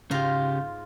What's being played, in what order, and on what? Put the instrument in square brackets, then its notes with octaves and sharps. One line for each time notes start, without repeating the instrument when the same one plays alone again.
[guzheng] G#2 F4 A#5 [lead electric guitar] C#3 G4